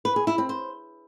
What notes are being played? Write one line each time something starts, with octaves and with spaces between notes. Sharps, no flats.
B4
G#4
E4
C4
C5